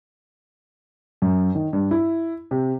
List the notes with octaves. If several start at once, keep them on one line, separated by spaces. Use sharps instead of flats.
F#2
D#3
G2
E4
C3